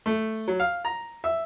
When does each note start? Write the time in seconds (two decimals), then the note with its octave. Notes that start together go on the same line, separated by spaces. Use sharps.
0.06 A3
0.48 F#3
0.60 F5
0.85 A#5
1.24 E5